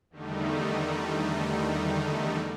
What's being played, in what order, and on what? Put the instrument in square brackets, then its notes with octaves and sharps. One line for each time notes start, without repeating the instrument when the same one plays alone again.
[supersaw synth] E2 D3 D#3 G3 A3 D#4